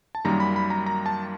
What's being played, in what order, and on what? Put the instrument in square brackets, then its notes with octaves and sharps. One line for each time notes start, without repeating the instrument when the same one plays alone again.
[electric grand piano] A5
F#2 D#3 G3 A#3 A#5
B5
B5
A#5
A#5
A5